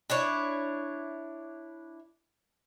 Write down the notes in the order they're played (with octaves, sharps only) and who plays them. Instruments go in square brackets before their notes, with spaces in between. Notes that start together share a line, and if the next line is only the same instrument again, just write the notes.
[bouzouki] D4 E4 C#5